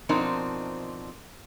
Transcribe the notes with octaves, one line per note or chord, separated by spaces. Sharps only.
B2 F3 C4 D4 D#4 A#4